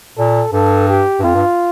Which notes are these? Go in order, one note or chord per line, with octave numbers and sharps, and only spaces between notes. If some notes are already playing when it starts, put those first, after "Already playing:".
A#2 A4
G2 A4
G4
G2
F2 F4
G2